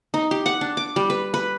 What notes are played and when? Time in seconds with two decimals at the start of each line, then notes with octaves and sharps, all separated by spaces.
0.14 D#4
0.31 G4
0.46 F#5
0.61 D4
0.77 D6
0.96 G3
1.10 B4
1.34 B4